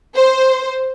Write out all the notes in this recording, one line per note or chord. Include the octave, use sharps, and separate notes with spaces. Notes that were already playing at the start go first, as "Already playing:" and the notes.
C5